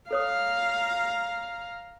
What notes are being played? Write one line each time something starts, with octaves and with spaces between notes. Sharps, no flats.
A4 C#5 F5 A#5 D#6